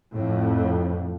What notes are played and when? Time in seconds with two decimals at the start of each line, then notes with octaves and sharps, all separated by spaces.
0.13 F2 A2